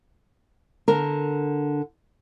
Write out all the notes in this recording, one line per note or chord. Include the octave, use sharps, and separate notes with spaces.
D3 A#4